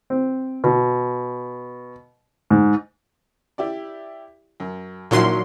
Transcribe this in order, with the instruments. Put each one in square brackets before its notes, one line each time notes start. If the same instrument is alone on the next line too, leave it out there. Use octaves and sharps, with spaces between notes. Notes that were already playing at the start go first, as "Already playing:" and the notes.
[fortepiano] C4
B2
G#2
E4 G4 D5
F#2
[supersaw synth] A#2 F#3 C6 [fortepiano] D#3 F3 E4